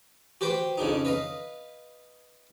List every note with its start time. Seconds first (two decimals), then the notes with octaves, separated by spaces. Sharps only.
0.41 F#4 G4 B4 C5 G5
0.78 F2 C#3 D4 D#4
1.05 B4 D#5 F5